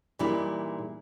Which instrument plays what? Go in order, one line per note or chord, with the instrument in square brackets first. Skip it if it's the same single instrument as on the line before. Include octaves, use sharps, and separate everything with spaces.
[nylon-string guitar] A#2 E3 G3 G#3 D#4 E4